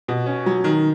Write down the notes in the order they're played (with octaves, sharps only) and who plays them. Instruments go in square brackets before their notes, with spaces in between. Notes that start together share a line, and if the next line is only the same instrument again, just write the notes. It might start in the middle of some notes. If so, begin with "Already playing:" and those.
[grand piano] B2
C#4
F#3
D#3